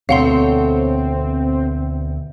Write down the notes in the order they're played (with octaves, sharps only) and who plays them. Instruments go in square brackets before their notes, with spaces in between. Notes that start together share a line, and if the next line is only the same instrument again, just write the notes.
[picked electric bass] D2 B2 [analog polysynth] C4 [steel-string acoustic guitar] A4 C#5 [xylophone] F5 F#5 C6